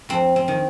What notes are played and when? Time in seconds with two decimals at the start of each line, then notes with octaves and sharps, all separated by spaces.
0.09 F2 C4
0.36 C4
0.48 D#3